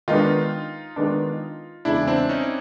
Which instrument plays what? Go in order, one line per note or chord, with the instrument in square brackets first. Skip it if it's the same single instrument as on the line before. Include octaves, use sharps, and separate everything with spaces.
[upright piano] D#3 G#3 B3 D4 [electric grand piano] D#4 F4
[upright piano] D#3 G#3 B3 D4
[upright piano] E2 C#3 E3 G#3 [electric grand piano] D4 E4
[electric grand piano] C4 D4
C#4 D#4